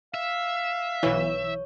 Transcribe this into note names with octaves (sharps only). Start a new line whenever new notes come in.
E5 F5
B1 E3 C#5